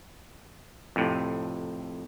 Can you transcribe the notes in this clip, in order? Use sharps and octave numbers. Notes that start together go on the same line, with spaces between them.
F2 A2 C3